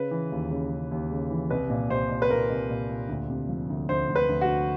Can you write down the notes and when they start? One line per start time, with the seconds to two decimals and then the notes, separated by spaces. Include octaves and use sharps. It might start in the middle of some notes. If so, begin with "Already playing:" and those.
Already playing: C#3 B4
0.11 E3
0.32 D#2
0.51 C#3
0.71 C#3
0.91 D#2
1.11 C#3
1.31 E3
1.50 C2 B4
1.70 A#2
1.90 C2 C5
2.10 A#2
2.22 B4
2.30 A#2 A#4
2.50 C2
2.69 A#2
2.89 A#2
3.09 D2
3.30 C3
3.49 F3
3.69 D2
3.89 D2 C5
4.09 D2
4.16 B4
4.29 D2
4.41 F#4
4.48 D2